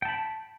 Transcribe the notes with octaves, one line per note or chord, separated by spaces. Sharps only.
G5 A5 B5